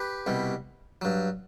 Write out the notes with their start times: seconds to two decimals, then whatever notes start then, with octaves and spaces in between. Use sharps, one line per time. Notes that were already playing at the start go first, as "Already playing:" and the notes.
Already playing: G4 B4
0.26 C2 B2 G3
1.01 G2 F#3